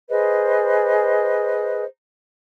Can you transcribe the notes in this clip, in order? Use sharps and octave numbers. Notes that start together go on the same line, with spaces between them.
G#4 B4 C5 D#5